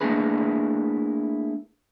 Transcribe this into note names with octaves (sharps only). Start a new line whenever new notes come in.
A3 A#3 D4 E4 G#4 B4